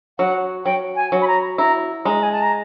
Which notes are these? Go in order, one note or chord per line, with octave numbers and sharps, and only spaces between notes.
F#3 F#5
F#3 G5
G#5
F#3
B5
A#5
E4 A#5
G#3 A#5
G#5
A5
A#5